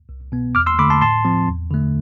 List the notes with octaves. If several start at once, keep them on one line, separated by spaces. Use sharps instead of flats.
C2
B2 B3
E2 D6 F6
C6 E6
D3 A3 B5 D6
A5 C6
A2 A5 C6
F3 C4
E2
D3 A3